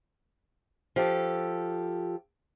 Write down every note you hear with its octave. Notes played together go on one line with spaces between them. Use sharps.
F3 G4 A4